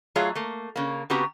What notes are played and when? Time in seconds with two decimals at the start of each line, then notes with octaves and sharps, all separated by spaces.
0.16 F#3 A3 F4 G#4 C#5 F5
0.35 A3 A#3
0.76 C#3 A#3
1.10 C#3 B3 C4 F#4 G4 A#5